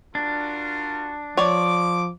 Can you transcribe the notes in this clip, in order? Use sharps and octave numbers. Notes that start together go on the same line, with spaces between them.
D4 F4 F#4 A#4
F3 C#5 D5 D6